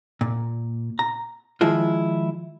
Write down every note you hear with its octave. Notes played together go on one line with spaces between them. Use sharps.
A#2
A#5
D#3 F3 G#3 E4 F4